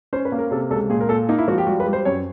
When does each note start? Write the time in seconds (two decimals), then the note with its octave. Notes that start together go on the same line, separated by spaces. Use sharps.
0.13 C#4 C5
0.25 B4
0.32 A#3
0.39 A#4
0.51 C3 A4
0.70 C#2 A4
0.90 A#2 G#4
1.00 A#4
1.09 A#2 A4
1.29 A#3 D#4
1.38 E4
1.48 F3 F#4
1.58 G4
1.67 G3 F#4
1.80 B4
1.86 G3
1.93 C5
2.05 F#2 C#5